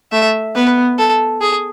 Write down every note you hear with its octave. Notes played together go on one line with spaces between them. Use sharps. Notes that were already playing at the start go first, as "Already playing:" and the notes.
A3 E5
B3 B4
A4
G#4